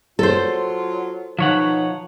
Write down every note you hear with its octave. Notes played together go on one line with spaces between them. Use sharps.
F#3 F4 A4 C5
B2 F3 D#4 C#5 F#5